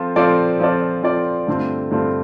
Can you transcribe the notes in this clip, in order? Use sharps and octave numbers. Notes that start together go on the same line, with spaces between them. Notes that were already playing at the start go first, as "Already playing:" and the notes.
Already playing: F3 C4 F4 A4
F3 C4 F4 A4 D5
F3 C4 F4 A4 D5
F3 C4 F4 A4 D5
G2 D3 A3 C4 F4
G2 D3 A3 C4 F4